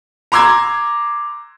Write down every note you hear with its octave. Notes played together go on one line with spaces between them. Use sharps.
A#5 C6 D6 E6 G#6